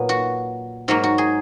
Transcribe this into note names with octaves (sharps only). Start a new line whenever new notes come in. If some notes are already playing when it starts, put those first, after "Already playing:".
Already playing: A#2 F#3 B3 B4
F#4
G#2 F#3 A#3 F#4
F#4
G#4